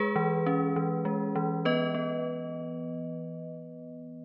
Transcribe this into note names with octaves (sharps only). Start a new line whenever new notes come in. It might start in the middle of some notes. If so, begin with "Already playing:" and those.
Already playing: G#3 G#4 B4
E3
C#4
E3
G#3
E3
B3 B4 D#5
B3